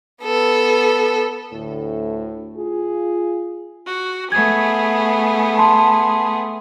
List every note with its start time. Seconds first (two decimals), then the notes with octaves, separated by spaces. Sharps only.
0.23 B3 A4
1.53 D2 A2
2.57 F4 G#4
3.88 F#4
4.32 A3 B3 G#4 G#6
5.58 A5 C6